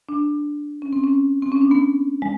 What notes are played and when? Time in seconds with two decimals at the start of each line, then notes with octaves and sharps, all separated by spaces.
0.09 D4
0.82 C#4
0.93 C4
1.04 C#4
1.42 C4
1.52 C#4
1.61 D4
1.71 B3
2.22 G#3